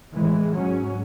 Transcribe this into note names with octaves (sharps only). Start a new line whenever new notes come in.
A2 E3 G#3
G#2 F#3 C#4